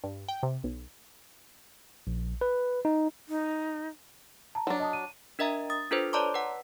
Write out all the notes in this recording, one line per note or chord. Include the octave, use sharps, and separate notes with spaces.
G2
G5
C3
B1
A#1
B4
D#4
D#4
A5 A#5
F#3 D4
D#5 A5 D#6
D#7
D4 A#4 D#5 E5 A#5
D#6 A6
D4 F4 A4 B4 C5
C#5 D5 A5 A#5 C6 D6
B4 F#5